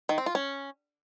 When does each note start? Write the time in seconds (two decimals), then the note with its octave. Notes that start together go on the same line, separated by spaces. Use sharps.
0.09 D#3
0.18 C4
0.26 F4
0.35 C#4